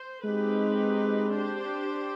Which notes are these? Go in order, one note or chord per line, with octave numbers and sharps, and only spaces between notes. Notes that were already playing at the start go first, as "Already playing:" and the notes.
Already playing: C5
G#3 C4 D#4 G4 B4
D4 G4 C5